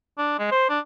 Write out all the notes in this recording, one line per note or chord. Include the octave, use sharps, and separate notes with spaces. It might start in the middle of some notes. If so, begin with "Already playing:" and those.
D4
G#3
C5
D4